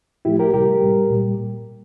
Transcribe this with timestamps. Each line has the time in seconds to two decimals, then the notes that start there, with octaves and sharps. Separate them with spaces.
0.25 A2 F3 A3 E4 G4
0.39 G4 A#4
0.54 C3 G3 G4 A#4
0.82 A2 G3
1.10 A#2 G3